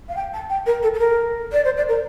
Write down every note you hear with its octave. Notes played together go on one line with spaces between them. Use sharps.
F5
G5
A5
G5
A#4
A4
A4
A#4
D5
C5
D5
A#4